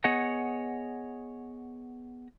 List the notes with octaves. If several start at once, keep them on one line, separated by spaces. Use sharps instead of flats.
B3 G#4 C#5 D#5 F#5